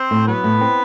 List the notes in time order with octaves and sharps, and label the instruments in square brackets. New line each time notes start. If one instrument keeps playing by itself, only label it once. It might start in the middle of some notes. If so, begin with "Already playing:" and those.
Already playing: [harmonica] C4 C5
[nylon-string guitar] A2
[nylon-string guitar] F#3 [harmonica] B3 B4
[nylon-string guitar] A2
C4